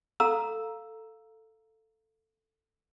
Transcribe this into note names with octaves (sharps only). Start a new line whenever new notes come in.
A4 F5 A#5 E6